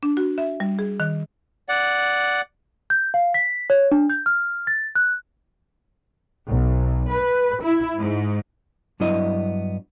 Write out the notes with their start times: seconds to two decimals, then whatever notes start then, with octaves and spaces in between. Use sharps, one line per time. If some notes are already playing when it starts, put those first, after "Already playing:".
0.03 D4
0.17 F#4
0.38 E5
0.60 G3
0.79 G#4
1.00 D#3
1.69 D5 F#5
2.90 G6
3.14 F5
3.34 B6
3.70 C#5
3.92 D4
4.10 G6
4.26 F6
4.67 A6
4.95 F#6
6.48 B1
7.10 B4
7.62 E4
7.98 G#2
9.00 G2 F#3 B3 D4 E4 D#5